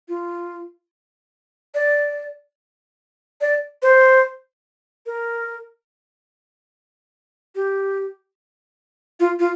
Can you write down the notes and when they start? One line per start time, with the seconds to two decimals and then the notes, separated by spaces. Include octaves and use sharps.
0.08 F4
1.74 D5
3.41 D5
3.82 C5
5.06 A#4
7.55 G4
9.20 F4
9.39 F4